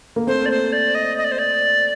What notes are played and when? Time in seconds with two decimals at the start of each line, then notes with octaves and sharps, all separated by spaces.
0.16 A#3
0.27 A3 C4 C5
0.46 D5
0.51 C5
0.73 D5
0.95 D#5
1.18 D#5
1.24 D5
1.32 C5
1.39 D5